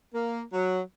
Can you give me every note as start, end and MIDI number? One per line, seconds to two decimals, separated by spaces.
0.14 0.41 58
0.53 0.80 54